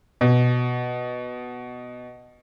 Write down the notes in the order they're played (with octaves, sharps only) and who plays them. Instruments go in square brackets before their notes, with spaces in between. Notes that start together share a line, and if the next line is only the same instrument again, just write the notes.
[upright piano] B2